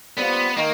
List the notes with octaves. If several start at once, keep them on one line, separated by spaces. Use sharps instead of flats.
G3 B3 C4 F4
D#3 A#3